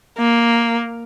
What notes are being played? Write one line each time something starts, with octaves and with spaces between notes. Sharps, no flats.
A#3